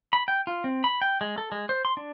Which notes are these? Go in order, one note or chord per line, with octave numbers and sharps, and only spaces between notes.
B5
G5
F4
C4
B5
G5
G#3
A4
G#3
C5
C6
D4